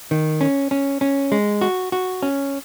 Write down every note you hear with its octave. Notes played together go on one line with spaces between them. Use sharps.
D#3
C#4
C#4
C#4
G#3
F#4
F#4
C#4